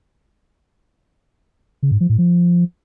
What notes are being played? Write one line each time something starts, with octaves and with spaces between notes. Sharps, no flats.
C#3
G#2
F3
A2
F3